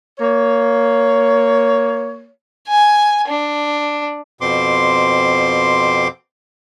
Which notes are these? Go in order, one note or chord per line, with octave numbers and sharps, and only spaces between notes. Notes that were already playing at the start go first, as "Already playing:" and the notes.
A#3 C#5
G#5
D4
F2 B2 C4 C6 D6